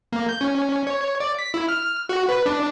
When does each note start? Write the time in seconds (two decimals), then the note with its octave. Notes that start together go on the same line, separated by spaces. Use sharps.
0.12 A#3
0.29 G6
0.41 C#4
0.87 C#5
1.20 D5
1.39 B6
1.54 E4
1.69 F6
2.09 F#4
2.29 B4
2.46 D4